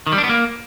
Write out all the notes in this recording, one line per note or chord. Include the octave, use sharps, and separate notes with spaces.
D#3
G3
D4
B3
A#3